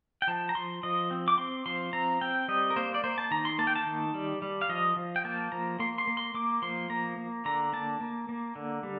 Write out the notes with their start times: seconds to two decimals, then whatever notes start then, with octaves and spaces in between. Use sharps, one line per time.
0.22 G5
0.27 F3 A5
0.49 A#5
0.55 F3 C6
0.83 F3 D#5
1.11 C4
1.28 D6
1.38 C4 C6
1.66 F3 C6
1.93 C4 A#5
2.21 C4 G5
2.48 G3 D#5
2.70 A#4
2.76 A#3 C5
2.94 D5
3.04 A#3 C5
3.18 A5
3.31 D#3 A#5
3.45 C6
3.59 A#3 A5
3.67 G5
3.76 A5
3.87 D#3
4.14 G3
4.42 G3
4.62 F5
4.69 F3 D#5
4.96 F3
5.16 G5
5.24 A#3 A5
5.52 F3 A#5
5.80 A#3 C6
5.98 C6
6.07 A#3
6.17 C6
6.34 A#3 D6
6.62 F3 C6
6.90 A#3 A#5
7.18 A#3
7.45 D3 A#5
7.73 A#3 A5
8.01 A#3
8.29 A#3
8.56 D3
8.83 G3